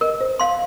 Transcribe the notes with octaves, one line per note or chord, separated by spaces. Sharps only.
A#4 D#5
C5
F5 C6